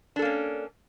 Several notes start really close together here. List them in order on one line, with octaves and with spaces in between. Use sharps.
D4 A4 A#3 C#4